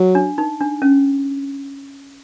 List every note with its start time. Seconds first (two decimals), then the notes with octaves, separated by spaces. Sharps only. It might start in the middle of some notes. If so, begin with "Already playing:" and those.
Already playing: F#3
0.15 D4
0.38 D#4
0.61 D4
0.82 C#4